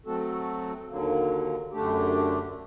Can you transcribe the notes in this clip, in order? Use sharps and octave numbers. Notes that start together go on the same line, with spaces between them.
F#3 A3 C4 F#4 A4
D#2 D3 F#3 A#3
F#2 D3 A3 D4 G4